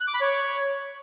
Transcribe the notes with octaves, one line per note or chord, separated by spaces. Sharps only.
F#6
D6
B5
C#5